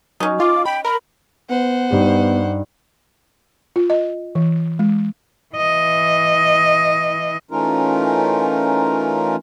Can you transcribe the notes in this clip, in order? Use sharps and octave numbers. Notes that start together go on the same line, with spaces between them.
F#3 C#4 D#4
F4 D6
G5 B5
A#4 B5
B3 C5 F#5
G2 D#4 G4
F4
D#5
E3
G#3
E3 D#5
E3 A3 C#4 D#4 F4 A#4